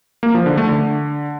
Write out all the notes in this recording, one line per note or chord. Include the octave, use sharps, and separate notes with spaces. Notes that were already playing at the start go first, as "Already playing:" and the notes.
A#3
F3
D3
A3
D3